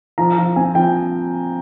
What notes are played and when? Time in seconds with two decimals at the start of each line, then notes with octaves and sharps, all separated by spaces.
0.18 F3 A#5
0.38 F3
0.56 C4 G#5
0.75 F3 G5